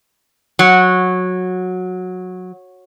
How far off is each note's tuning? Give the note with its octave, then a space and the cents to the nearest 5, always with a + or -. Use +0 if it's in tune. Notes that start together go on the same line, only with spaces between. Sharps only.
F#3 -15